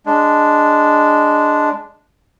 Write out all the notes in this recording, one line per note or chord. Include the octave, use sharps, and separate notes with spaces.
G#3 D4